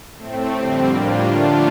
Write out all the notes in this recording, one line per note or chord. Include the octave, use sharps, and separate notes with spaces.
A2 A3 C4
F2 D3 G3 C4
A2 G3 A#3 D4 F4
D3 F3 A3 D4 F4